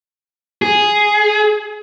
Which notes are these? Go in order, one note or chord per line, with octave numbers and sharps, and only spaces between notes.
G#4